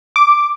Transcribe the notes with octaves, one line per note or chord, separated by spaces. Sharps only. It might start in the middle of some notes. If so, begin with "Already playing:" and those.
D6